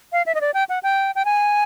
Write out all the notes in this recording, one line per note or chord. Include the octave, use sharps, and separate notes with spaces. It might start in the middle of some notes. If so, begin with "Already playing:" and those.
F5
E5
D#5
D5
G5
F#5
G5
G5
G#5